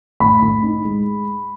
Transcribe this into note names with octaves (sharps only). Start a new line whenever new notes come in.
A2 B5
A2
D#4
G#3